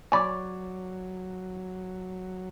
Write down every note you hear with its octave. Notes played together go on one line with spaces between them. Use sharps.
F#3 C#5 D5 G#5 B5 D6